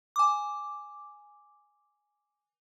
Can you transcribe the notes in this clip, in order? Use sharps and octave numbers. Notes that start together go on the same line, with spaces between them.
G#5 D6